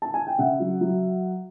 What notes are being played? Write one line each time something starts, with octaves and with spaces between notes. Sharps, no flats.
A5
G#5
G5
C#3 E5 F#5
F#3
F#3